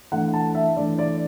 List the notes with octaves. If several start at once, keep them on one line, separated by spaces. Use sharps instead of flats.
E3 A3 D4 F#5
A5
E5
E3 A3 D4 D5
D5